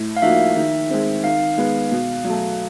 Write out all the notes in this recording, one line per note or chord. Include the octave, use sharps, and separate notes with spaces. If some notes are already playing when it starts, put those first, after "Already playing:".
Already playing: A2
F5
F3 A#3 D#4 F#4 E5
D#3
G#3 C4
D#3 F5
G#3 B3
B2
F#3 A3